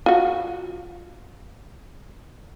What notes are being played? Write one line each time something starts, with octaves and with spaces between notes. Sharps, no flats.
F4 F#4